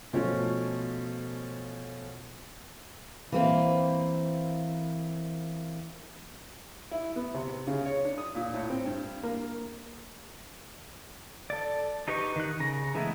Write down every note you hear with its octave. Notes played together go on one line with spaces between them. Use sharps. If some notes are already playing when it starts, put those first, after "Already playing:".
B2 F3 A3 C#4
E3 A#3 C4
E4
B3
C3
C#3
C#5
D4
D#6
A#2
A2
C4
G2
A#3
A4 D5
D#4 G4 B4 D#5 C#6
D#3 F#6
C#3 A#5
E3 G#3 A3 B3 E4